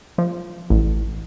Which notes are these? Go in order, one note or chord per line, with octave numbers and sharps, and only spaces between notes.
F3
A1